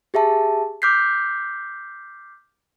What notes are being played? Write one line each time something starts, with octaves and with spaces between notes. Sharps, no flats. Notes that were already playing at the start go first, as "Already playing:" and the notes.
G4 G#4 E5 A5
D6 F6 G6 B6 C7